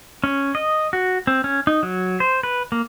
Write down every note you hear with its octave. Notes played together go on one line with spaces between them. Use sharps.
C#4
D#5
F#4
C4
C#4
D#4
F#3
C5
B4
A#3